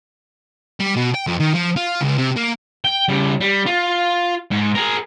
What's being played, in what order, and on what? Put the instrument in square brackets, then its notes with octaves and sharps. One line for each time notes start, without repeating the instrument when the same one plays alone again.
[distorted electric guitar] G3
B2
G5
F2
D#3
F3
F4
C#2
C3
A#3
G5
C#3 G3
G3
F4
G#2
G#4 A#4